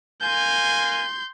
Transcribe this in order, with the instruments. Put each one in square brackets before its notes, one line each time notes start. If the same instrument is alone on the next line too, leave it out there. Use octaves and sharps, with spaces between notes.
[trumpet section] A#4 F5 G#5 [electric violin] C6 G6